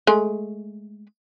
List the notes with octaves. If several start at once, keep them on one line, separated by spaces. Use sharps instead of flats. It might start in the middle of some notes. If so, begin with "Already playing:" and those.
G#3 A3